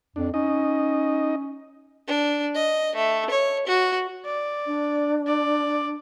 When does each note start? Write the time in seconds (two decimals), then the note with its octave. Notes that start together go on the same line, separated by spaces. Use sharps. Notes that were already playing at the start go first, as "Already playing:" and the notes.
0.16 F2 D4
0.34 C#4 D#4 D#5
2.08 D4
2.55 D#5
2.95 A3
3.30 C#5
3.67 F#4
4.25 D5
4.66 D4
5.26 D5